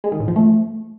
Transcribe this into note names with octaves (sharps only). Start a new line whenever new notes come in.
G#3
D#3
A2
F3
A3